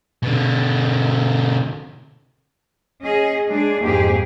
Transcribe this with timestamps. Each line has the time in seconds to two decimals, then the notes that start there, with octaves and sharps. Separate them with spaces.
0.23 B2 D3
3.02 C#4 G#4 D#5
3.49 G#3 D4 G#4
3.82 F2 G#2 A#3 G4 G#4